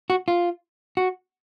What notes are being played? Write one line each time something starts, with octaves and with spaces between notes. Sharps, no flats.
F#4
F4
F#4